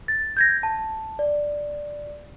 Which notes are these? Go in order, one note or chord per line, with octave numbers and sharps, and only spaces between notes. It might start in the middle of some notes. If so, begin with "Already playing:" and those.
A6
G6 G#6 A#6
A5
D5